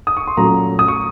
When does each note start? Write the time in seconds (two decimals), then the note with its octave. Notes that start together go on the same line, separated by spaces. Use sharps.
0.07 D#6
0.17 C#6
0.27 C6
0.37 A#2 F#3 A3 C#4 A#5
0.79 D#6
0.88 C#6